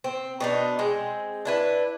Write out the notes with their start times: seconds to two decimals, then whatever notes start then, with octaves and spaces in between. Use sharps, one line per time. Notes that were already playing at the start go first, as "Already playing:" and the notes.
0.04 C4
0.40 B2 D4 D#4
0.79 G#3 C4
1.45 D4 E4 B4